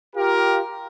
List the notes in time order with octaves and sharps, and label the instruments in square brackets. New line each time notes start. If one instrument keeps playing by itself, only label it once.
[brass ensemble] F4 G4 A#4